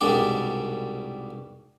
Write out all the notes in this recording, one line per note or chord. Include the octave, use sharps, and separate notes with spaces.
C2 G#2 B2 G3 D4 D5